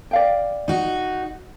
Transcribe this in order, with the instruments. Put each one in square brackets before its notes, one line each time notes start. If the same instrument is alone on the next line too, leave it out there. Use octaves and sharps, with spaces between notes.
[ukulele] D5 F5 G5
[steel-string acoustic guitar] D#4 F#4